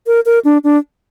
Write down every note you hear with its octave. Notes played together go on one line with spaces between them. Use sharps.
A#4
A#4
D4
D4